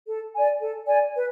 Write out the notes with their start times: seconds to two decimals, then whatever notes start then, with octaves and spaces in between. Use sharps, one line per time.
0.08 A4
0.35 D5 G#5
0.61 A4
0.88 D5 G#5
1.15 B4